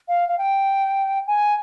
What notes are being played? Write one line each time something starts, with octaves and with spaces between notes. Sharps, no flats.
F5
F5
G5
G#5